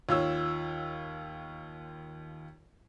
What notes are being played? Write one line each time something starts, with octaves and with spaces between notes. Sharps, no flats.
D#2 F4 C#5 E6